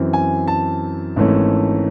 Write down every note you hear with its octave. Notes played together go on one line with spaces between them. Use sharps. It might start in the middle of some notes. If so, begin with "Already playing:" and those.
Already playing: F#2 E3 C4
G#5
A5
G#1 G#2 E3 A3 C#4